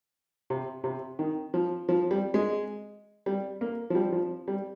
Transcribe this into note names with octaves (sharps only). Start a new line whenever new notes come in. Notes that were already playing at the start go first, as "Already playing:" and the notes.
C3
C3
D#3
F3
F3
G3
G#3
G3
A#3
F3
G3
F3
G3